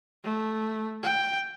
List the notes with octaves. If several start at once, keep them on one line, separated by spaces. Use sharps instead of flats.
A3
G5